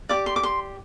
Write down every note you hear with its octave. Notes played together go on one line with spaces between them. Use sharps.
G4 D5 D6
C6
D6
C6